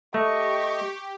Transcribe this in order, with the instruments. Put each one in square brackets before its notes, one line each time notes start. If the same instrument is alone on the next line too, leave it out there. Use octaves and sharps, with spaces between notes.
[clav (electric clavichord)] A3 [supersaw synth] G4 [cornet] D#5 [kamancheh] C#6